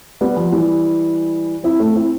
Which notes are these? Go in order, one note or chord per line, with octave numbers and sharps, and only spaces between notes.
G3 B3
F3
E3 G3
C4 E4
A3 C4
C4 E4